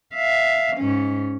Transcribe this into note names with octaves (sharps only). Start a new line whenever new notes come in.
E5 F5
G#2 C#4